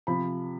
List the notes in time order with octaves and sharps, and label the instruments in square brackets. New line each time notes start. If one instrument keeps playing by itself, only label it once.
[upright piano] C3 F3 B5